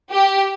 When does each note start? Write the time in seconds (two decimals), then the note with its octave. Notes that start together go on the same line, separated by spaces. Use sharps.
0.11 G4